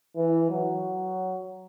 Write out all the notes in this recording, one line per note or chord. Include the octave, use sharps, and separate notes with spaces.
E3
F#3